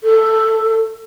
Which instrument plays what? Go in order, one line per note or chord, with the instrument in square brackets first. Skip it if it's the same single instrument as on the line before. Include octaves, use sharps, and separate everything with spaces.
[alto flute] A4